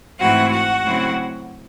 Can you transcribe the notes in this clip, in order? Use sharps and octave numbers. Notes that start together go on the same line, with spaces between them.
G#2 E3 A3 C4 E4 F#4 F#5
F#4 F#5
C#3 F#3 A3 C4 E4